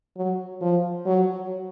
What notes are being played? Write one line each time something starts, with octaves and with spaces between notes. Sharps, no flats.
F#3
F3
F#3